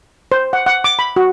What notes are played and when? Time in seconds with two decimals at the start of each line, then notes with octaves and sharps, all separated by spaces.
0.32 C5
0.53 F#5
0.66 F#5
0.84 D6
0.99 B5
1.16 F#4